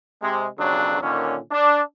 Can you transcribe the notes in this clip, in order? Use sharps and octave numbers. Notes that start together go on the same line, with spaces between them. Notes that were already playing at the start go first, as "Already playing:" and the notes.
C3 G#3
B1 F2 C#3 F#3 D4
A#2 D3 D#3 C#4
D4